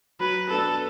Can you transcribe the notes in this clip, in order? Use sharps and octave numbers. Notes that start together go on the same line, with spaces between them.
F#3 B4
B3 D4 A4